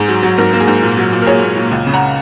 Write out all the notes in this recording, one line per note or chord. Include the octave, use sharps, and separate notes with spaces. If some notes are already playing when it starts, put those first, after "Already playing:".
Already playing: G#2 G#4
F#3
F#3
G#2 A#4
A#3
G#4
G#2
A#2
F#3
A#2
A#4
A#2 G#4 C#5
A#2
A#2
C#2
C#3
F#5 A#5